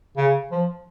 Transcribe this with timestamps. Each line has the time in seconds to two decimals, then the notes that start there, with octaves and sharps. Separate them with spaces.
0.17 C#3
0.51 F3